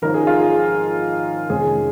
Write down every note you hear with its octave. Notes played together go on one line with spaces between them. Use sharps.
G#1 G#2 F3 C#4 A#4
G#4
F4
G#4
F1 F2 D#3 G#3 C#4 G#4